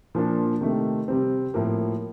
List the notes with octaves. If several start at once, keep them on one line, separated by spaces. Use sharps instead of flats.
A#2 F3 A#3 D4
C3 D#3 A3
C3 G3 C4
A2 F3 A#3